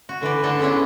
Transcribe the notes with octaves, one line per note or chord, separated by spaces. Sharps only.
F#4
D3 E3 B4 D5
D3 A3 D4 A4
G#3 B3 C#4 D4 E4